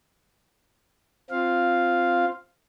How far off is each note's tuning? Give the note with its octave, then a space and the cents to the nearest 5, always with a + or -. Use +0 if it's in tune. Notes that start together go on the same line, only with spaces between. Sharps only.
C4 +0 F4 +0 F5 +0